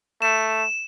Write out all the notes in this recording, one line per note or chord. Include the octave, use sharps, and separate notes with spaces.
A3 E7